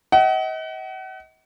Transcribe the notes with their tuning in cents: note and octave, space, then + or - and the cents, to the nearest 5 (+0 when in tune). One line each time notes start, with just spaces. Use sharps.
D#5 +40 F#5 +35